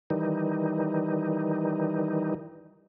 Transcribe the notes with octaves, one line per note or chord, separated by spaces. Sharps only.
D#3 E3 G3 D#4